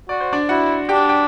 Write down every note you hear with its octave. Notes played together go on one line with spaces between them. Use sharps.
F#4 D5
C5
D4 D5
E4 F#4 F#5
D4 G4 G5
G5